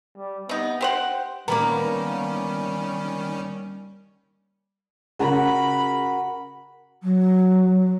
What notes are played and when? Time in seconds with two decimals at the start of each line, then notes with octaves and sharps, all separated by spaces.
0.16 G3
0.49 C3 B3 D#4
0.81 G4 C5 F#5 G5
1.48 D#3 G3 A#3 B3 C#4 A#5 B5 D6
5.19 C#3 F#4 A#4 F#5 B5
7.02 F#3